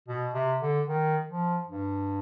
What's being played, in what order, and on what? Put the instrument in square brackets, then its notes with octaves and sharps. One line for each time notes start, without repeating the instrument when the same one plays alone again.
[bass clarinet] B2
C3
D3
D#3
F3
G2